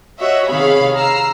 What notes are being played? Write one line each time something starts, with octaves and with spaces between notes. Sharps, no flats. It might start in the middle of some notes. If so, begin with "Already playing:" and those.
F#4 C#5 D#5 E5
C3 D#3 G#4 C#5 F5 B5
A#5 E6 F6 C7